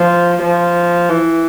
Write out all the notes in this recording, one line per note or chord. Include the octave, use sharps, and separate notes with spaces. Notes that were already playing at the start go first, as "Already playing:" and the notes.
Already playing: F3
F3
E3